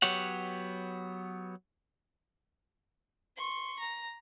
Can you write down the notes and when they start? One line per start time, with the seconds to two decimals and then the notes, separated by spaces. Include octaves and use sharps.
0.02 F#3 B3 G4 C#5 F#5
3.37 C6 C#6
3.80 A#5